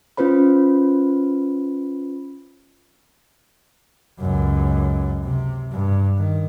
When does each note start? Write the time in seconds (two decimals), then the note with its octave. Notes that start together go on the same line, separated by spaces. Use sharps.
0.17 C#4 F4 B4 C5 B5
4.19 C#2 F#2
5.24 C3
5.71 G2
6.18 D#3